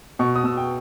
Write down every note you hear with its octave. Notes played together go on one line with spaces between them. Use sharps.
B2 C#6
D#6
B2 E6
G5